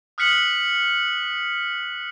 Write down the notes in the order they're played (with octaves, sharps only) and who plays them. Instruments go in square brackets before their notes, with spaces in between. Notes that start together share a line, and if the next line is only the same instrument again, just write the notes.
[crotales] D#6 F6 F#6 B6 C#7 F#7